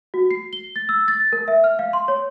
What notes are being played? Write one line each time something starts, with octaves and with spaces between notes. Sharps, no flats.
F#4
C7
G7
A6
E6
A6
A#4
E5
F6
F5
C6
C#5